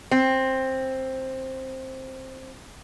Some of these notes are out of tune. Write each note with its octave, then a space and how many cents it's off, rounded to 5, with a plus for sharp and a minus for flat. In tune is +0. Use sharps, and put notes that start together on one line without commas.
C4 +10